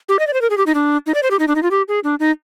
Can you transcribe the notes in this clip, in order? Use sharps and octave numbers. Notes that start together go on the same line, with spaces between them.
G4
D#5
D5
C5
A#4
G#4
G4
D#4
D4
D#4
D5
C5
G4
D#4
D4
D#4
F4
G4
G#4
D4
D#4